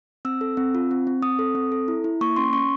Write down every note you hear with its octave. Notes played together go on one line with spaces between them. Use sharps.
C4 E6
A4
C4
F4
C4
C4
C4 D#6
A4
C4
A4
E4
E4
A#3 C#6
C#4 C6
C#4 C#6